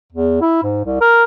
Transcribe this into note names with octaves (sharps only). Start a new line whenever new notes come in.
E2
E4
G#2
C2
A#4